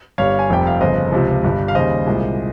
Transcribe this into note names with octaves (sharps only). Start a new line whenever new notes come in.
G1 G2 G3 C#5 F5
G#5
F1 F2 C3 G3 G5
F5
G1 F2 C#3 C5 D#5
C#2 C3 F3
G1 G2 G3
F5
D#2 C#3 G3 C5 D#5
C2 A#2 G#3